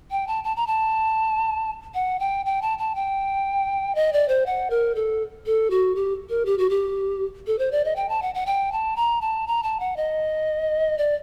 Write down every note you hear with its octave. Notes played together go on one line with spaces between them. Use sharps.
G5
A5
A5
A#5
A5
F#5
G5
G5
A5
A5
G5
D#5
D5
C5
F#5
A#4
A4
A4
F#4
G4
A#4
G4
F#4
G4
A4
C5
D5
D#5
G5
A5
F#5
F#5
G5
A5
A#5
A5
A#5
A5
F#5
D#5
D5